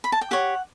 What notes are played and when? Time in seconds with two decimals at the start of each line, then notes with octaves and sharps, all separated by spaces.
0.04 B5
0.12 A5
0.21 G5
0.31 G4 C#5 F#5